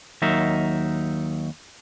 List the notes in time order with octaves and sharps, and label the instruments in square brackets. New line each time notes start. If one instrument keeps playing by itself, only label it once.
[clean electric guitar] D#2 F#3 D#4 A#4 E5